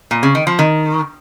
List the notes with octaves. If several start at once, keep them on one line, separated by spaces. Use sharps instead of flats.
A#2
C#3
D#3
F3
D#3